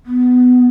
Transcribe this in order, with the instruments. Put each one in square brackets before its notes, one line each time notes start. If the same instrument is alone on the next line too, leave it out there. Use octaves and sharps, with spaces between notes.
[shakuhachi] B3